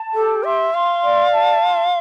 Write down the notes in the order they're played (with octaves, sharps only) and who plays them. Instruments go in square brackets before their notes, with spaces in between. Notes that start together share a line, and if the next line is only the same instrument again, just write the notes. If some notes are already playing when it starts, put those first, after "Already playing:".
Already playing: [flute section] A5
[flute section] G4 [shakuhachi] A4
[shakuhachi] E5 [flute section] C6
[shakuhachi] F5 [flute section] C6
[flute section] D5
A5
C6